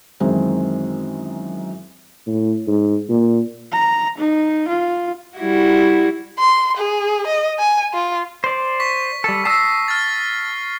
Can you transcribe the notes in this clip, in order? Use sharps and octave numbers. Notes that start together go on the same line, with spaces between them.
F#2 D#3 E3 G#3 C4
A2
G#2
A#2
A#5
D#4
F4
G3 E4 F#4
C6
G#4
D#5
G#5
F4
C5 D5
C#6 B6
G3 A4
A5 D#6 E6 A#6 C7
F6 A6